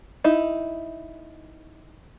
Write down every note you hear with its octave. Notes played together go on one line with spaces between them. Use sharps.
D#4 E4